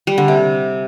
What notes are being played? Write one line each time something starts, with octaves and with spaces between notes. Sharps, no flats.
G3
D3
C3